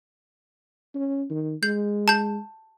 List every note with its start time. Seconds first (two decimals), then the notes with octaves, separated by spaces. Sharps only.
0.94 C#4
1.30 D#3
1.63 G#3 G6
2.08 A5 G6